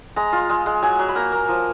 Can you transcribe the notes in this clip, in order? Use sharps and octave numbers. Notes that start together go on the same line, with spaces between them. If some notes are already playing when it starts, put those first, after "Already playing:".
G#3 A#5
F4
G#3
G#3
F#3 G#5
F#3
B5
A#3 A#5
A#3
F3